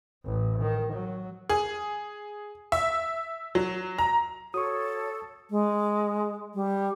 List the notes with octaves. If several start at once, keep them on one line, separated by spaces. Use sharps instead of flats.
A1
D#3
F#3
G#4
E5
F#3
A#5
F#4 A4 C#5 C#6 D#6
G#3
G3